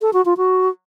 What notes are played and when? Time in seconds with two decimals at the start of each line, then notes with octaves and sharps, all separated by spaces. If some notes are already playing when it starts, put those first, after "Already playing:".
0.01 A4
0.13 F#4
0.25 F4
0.37 F#4